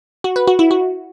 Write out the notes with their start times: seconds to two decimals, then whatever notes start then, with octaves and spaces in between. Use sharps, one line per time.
0.24 F#4
0.36 B4
0.47 F#4
0.59 E4
0.71 F#4